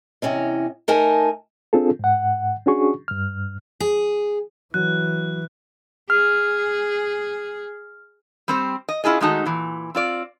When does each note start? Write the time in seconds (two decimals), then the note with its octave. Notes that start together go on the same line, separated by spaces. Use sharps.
0.22 E2 C3 C#4 D#5
0.88 A3 D#4 A#4 D#5 G#5 A5
1.73 C4 D4 F4 G#4 A4
1.99 G#2 F#5
2.66 C#4 D4 F#4 G#4 C#6
3.08 G2 F6
3.80 G#4
4.74 E3 F#3 F#6
6.10 G#4 F6
8.48 G3 C4 C5
8.89 D#5
9.04 C#4 E4 F4 G#4 D#5
9.21 D#3 G#3 A3 D#4 F#4 A5
9.45 A#2 E3
9.95 C4 F4 D5